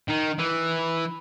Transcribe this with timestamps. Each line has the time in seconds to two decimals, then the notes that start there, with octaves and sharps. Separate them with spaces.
0.08 D#3
0.38 E3